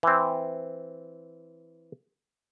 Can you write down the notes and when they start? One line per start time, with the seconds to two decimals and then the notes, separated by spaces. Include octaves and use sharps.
0.03 E3 C4